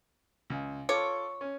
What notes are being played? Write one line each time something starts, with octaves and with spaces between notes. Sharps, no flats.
C#2
F4 A4 C#5 D6
C#4